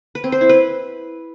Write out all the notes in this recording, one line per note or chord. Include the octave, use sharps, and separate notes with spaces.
B4
C4
C5
E4
B4